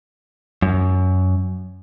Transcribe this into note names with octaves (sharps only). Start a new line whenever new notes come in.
F#2